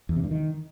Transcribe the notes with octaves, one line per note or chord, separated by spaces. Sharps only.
E2
C3
G2
D#3